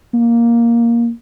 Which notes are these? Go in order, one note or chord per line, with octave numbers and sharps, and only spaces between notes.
A#3